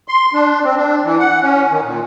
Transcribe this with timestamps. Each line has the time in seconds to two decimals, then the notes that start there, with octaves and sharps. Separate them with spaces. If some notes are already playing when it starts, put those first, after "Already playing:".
0.08 C6
0.34 D4
0.64 C4
0.77 D4
1.04 E3
1.19 F#5
1.42 C#4
1.71 D#3
1.83 A#2